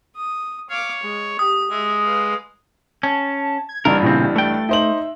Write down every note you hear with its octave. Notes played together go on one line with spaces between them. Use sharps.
D#6
C#5 F5 D6
G#3
G4 D#6
G#3 E5
B4 F5
C#4 A5
G#6
A1 G2 D4 A#4
A#2 C#3 C4 E4
A3 G5 A6
D#4 C5 E5 F#7